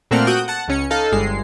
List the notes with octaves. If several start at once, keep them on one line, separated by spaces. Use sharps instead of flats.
A#2 A3 A#3 C4 F#5 F6
F#4 F#5 D#6 G6 D7
F#5 A5
C#2 C#4 C#7
D#4 A4 F5
G1 G2 G#3 C7